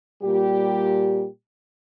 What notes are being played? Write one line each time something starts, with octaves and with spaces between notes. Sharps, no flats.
A#2 G3 G4